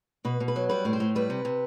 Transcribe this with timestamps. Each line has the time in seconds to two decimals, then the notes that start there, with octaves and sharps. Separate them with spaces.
0.25 B2 B4
0.40 B2
0.48 B4
0.56 F#3
0.69 G3 B4
0.85 A2
0.93 C5
1.00 A2
1.15 G3 B4
1.30 C3
1.45 C3